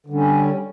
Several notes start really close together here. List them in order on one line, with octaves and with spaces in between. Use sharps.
D3 G3 C#4